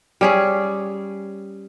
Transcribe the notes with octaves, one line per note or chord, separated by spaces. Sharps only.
G3 C#4 G#4